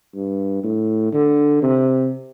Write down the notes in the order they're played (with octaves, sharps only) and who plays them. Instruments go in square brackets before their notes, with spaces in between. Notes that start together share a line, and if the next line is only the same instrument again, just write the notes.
[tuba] G2
A2
D3
C3